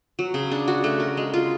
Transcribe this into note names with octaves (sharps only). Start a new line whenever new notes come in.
F#3
C#3
D4
F#4
A3
A#4
G#3
F4